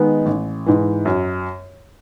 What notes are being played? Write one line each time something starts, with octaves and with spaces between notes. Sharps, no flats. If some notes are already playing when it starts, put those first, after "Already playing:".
Already playing: D#3 G#3 B3
A1
G#2 E3
F#2